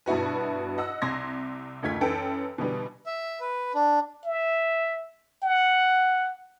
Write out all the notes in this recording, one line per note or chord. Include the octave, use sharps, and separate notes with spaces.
G2 B2 E4 F#4 B4
D#5 F#5 E6
C2 C3 C6 G#6 A#6
F#1 D2 A3 F4 G#6 B6
F#2 E3 A4 G5 D7
B2 D3 E3 G3 B3
E5
B4
D4
E5
F#5